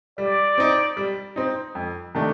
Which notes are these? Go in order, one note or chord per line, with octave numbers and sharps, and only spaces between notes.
G3 D5
C4 D#4
G3
C4 D#4
F2
C3 D#3 A3 D4